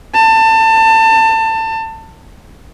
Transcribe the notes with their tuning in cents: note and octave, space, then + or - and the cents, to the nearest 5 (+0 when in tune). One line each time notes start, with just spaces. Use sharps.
A5 +25